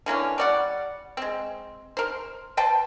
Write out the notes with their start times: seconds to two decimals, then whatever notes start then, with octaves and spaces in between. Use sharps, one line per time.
0.06 D3 E3 A#3 C#4
0.38 G3 D5 F#5
1.17 G#3 C4
1.97 A#4 C5
2.57 B4 C5 G5 A5